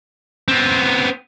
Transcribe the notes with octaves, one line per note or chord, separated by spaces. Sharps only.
B3 C4